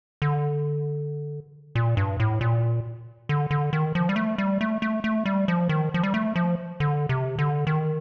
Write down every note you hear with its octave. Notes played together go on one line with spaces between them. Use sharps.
D3
A#2
G2
A2
A#2
D3
D3
D#3
F3
G3
A3
G3
A3
A3
A3
G3
F3
D#3
F3
G3
A3
F3
D3
C3
D3
D#3